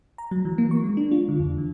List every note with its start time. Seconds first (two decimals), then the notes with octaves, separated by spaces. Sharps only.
0.18 A#5
0.31 F#3
0.45 E3
0.58 A#3
0.71 C#6
0.84 G#3
0.97 D4
1.12 F4
1.28 D3
1.40 F2
1.58 E3